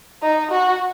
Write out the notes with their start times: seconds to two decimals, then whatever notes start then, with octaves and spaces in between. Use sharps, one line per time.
0.23 D#4
0.51 F#4